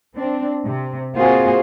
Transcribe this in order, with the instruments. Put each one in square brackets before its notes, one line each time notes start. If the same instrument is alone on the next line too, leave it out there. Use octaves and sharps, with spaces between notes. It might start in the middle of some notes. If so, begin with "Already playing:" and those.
[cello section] C4 D4
C3
A#3 C4 F4 F#4 G#4 C5